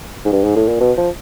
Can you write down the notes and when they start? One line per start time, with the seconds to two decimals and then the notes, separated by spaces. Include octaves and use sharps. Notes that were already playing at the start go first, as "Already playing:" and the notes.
0.25 G#2
0.32 G2
0.44 G#2
0.56 A2
0.68 A#2
0.80 B2
0.97 F3